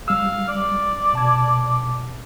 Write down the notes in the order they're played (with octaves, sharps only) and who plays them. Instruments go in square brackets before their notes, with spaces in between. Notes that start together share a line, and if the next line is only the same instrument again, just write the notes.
[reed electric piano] G3 E6 [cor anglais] F5
[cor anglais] D5
[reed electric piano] B2 A5 G#6